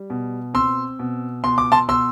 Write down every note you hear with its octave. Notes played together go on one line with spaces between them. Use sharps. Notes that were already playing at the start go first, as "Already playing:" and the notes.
Already playing: G3
B2
C4 C6 E6
B2
B2 C6
D6
A5 C6
B2 C6 E6